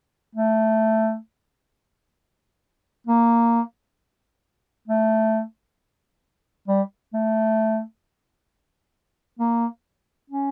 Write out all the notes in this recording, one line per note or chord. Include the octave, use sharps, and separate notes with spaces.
A3
A#3
A3
G3
A3
A#3
C#4